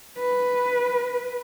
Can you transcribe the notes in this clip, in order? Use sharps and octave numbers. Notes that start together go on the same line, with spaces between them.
B4